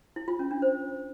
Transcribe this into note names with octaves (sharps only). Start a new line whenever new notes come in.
E4
F4
C#4
D4
C5